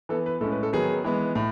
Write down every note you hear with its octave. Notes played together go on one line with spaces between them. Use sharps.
E3 B3 A4
B4
A2 G#3 C#4 A4
B4
A4
D#3 F#3 B3 G#4
E3 G#3 B3
A2